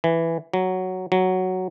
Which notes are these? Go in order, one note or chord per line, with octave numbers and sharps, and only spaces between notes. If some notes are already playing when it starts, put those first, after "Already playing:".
E3
F#3
F#3